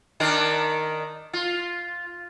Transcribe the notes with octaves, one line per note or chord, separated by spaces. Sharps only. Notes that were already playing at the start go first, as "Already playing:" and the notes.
D#3 D4 A#4
F4